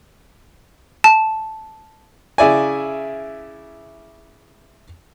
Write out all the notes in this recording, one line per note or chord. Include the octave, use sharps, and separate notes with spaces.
A5
C#3 E4 D5 G#5